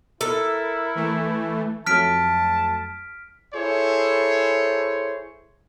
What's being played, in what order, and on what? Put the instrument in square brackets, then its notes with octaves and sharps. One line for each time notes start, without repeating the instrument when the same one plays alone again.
[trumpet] E4 [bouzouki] A4 [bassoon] A#4
[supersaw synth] E3 A3
[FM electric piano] F2 F#3 A3 [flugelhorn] A5 [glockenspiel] F6 B6 D7
[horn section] E4 G#4 A4 C5 C#5